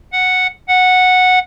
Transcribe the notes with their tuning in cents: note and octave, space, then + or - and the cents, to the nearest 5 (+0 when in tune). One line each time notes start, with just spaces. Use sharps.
F#5 -5
F#5 -10